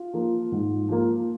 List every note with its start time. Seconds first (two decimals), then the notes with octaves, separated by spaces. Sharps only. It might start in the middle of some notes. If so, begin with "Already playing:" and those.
Already playing: F4
0.14 F3 A#3
0.52 G#2
0.89 F3 A#3